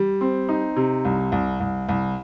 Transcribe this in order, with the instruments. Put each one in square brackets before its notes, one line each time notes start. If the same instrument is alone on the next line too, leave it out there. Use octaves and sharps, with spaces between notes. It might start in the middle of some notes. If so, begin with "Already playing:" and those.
Already playing: [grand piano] G3
C4
D#4
C3
C2
C2
C2
C2